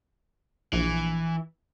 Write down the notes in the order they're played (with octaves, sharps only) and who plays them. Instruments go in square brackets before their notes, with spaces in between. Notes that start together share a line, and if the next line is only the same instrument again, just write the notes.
[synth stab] A#1 [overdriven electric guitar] E3